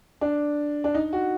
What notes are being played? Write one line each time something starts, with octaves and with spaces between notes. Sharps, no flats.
D4
D4
D#4
F#4